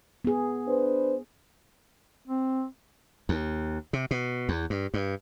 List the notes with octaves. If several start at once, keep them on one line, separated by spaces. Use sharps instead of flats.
B3 G#4
D4 B4 C5
C4
D#2
C3
B2
E2
G2
G2